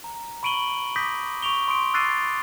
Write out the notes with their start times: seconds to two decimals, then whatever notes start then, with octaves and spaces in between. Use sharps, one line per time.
0.04 A#5
0.43 B5 C#6 D7 D#7 F#7 G7
0.96 D6 D#6 G6 A#6 B6
1.43 C#6 D7 F7 G7
1.68 C6 D#6 D7
1.93 D6 E6 F#6 A6 C7 D#7